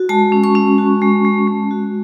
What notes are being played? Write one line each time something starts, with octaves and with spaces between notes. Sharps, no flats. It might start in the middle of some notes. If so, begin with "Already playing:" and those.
Already playing: F#4
G#3 A5
C#4
C#6
C#4
F#4
G#3
G#3
G#3
F#4